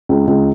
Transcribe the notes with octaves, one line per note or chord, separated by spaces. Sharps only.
C#2
C#2